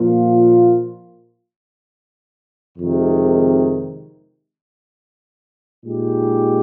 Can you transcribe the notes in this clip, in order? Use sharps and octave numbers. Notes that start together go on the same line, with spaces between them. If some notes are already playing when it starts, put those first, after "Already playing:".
Already playing: A#2 F3 A#3 F4
F2 C3 D#3 G#3
A#2 G#3 D#4 G4